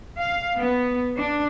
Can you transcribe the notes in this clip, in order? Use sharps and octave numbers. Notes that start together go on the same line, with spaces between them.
F5
B3
D4